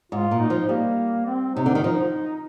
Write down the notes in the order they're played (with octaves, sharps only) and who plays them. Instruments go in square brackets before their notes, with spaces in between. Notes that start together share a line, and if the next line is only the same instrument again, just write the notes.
[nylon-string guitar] G#2 [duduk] F4
[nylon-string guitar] A#2
[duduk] D#4
[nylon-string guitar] F3
[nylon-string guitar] G3 [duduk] A#3
[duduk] C4
[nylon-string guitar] C3 [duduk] D#4
[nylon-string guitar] D3
D#3
[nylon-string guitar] F3 [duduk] D#4